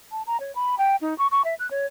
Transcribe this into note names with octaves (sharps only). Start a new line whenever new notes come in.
A5
A#5
C#5
B5
G5
D#4
C#6
C#6
E5
F#6
C#5